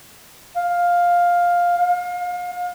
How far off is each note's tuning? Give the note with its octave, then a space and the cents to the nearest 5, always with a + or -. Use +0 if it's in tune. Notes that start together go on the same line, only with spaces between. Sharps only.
F5 +10
F5 +35